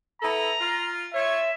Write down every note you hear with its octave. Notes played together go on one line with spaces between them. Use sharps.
B3 E4 A4 A#5
F4
F4 C#5 E5